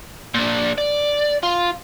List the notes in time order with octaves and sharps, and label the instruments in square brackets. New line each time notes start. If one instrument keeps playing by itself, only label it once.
[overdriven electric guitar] A#2 D4
D5
F4